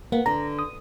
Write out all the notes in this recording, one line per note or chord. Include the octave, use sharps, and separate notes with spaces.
A#3 B3
D3 A#5
D#6